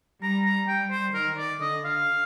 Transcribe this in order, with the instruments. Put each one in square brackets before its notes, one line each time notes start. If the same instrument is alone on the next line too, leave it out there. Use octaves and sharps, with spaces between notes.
[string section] G3 [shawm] A#5
[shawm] A#5
[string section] G3 [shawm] G5
[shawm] C5
[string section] D#3 [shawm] A#4
[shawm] D5
[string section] D3 [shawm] D#5
[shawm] F5